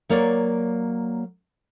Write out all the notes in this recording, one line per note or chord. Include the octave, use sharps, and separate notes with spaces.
F#3 A#3 A#4 C#5 D5